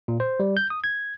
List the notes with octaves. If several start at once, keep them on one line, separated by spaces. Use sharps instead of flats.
A#2
C5
G3
G6
D#6
G#6